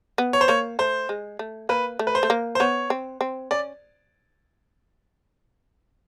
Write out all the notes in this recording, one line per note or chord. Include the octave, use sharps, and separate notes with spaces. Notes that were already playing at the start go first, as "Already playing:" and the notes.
B3
C#5
C5
A#3 C#5
A3 C5
G#3
A3
A#3 B4
A3
B4
C5
A3
A#3
C5
B3 C#5
C4
C4
C#4 D5